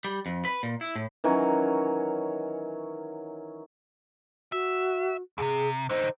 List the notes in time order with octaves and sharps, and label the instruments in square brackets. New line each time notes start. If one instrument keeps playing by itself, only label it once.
[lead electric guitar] G3
F2
B4
A#2
E4
A2
[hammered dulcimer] D#3 E3 F#3 C#4
[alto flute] F#4 [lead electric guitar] E5
[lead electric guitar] D#2 C3 [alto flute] G#4
[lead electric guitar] D3 D#4 [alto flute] C5